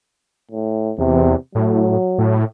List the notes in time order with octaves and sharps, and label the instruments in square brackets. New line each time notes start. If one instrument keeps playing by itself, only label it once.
[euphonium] A2
[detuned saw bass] E2 [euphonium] C3
[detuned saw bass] A2 [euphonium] F#3
[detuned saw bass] A2